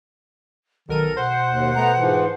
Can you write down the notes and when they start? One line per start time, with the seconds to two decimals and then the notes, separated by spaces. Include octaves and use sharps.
0.89 B1 D#3 A4 A#4 D#7
1.17 B2 C5 F#5
1.49 D#2
1.76 A3 B3 A#5
1.98 G#2 E3 F3